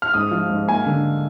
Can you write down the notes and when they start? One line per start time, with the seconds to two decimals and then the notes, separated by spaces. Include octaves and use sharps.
0.02 F6
0.14 G#2 D#6
0.31 F3
0.50 G#2
0.67 A#3 G#5
0.86 D3